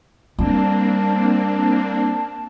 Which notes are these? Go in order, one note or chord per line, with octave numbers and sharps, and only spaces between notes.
G3 A#3 C4 D4 A5